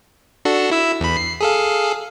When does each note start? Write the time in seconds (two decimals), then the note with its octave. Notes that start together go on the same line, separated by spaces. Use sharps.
0.45 D4 F#4 A4
0.71 E4 E6
1.00 E2 B5
1.17 C7
1.41 G#4 A4 F5